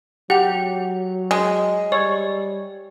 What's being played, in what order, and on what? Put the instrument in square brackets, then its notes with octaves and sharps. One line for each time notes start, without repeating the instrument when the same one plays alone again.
[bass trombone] F#3 [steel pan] G4 [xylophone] F#5 F7
[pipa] G#3
[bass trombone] G3 [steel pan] C#5 [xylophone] D5